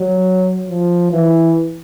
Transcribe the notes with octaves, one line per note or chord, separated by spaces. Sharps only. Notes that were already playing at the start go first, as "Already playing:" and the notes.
Already playing: F#3
F3
E3